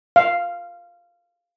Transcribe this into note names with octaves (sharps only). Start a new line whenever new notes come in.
F5